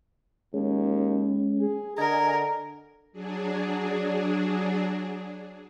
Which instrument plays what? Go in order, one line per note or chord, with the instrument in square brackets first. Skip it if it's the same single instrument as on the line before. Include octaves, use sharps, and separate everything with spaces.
[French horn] D#2 [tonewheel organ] G#3 C#4
[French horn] G#4
[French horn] D3 [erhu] A#4 [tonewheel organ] D#5 G#5
[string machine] F#3 D4 G#4